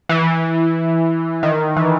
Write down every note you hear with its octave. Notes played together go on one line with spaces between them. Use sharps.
E3
D#3
E3